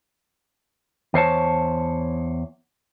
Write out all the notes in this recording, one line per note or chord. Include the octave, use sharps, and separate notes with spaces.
E2 C5 C#5 A5